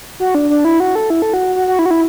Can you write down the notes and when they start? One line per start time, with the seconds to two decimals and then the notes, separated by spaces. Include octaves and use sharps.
0.20 F#4
0.35 D4
0.50 D4
0.65 E4
0.80 F#4
0.95 A4
1.10 E4
1.22 A4
1.34 F#4
1.56 F#4
1.68 F#4
1.79 E4
1.86 F#4
1.91 E4